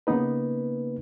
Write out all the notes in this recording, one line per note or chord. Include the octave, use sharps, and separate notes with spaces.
C#3 A#3 B3 D#4 B4